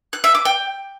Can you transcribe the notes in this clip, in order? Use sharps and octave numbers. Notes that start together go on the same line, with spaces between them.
F#6
E5
D6
G5